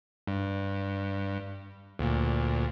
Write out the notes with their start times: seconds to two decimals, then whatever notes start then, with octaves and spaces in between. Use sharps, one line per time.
0.27 G2
1.99 D2 A#2